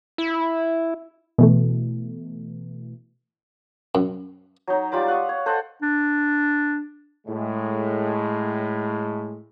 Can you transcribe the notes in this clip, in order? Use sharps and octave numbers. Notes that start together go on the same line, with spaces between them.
E4
B2 E3 A3
F#2
F#3 D#4
G3 F4 B5 D6
F5 F#5 C#6 D#6
C#5
A4 C5 D#5 F#5
D4
A2 G#3